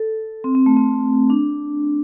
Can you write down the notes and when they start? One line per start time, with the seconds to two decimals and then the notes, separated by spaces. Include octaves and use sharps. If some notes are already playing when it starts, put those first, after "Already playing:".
Already playing: A4
0.44 C4
0.55 C4
0.66 A3
0.77 C4
1.30 D4